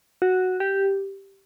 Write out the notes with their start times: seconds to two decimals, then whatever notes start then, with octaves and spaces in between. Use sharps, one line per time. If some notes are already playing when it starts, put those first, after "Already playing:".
0.22 F#4
0.60 G4